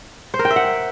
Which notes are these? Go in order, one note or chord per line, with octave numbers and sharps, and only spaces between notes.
C5
A#4
G5
E5
F#5